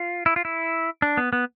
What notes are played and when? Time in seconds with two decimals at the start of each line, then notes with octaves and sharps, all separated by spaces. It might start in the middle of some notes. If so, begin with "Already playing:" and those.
Already playing: F4
0.26 E4
0.36 F4
0.45 E4
1.02 D4
1.17 B3
1.33 B3